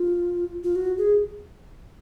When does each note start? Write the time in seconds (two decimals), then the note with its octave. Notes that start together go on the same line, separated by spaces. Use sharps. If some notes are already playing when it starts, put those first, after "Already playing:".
Already playing: F4
0.64 F4
0.76 F#4
0.98 G#4